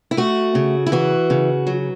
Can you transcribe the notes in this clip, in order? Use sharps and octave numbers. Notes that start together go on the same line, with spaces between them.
E4
A3 F#4
C#3
E4
E3 F#4
C#3
F#3